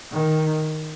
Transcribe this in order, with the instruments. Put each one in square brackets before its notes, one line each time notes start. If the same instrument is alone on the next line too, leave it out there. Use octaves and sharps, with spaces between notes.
[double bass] D#3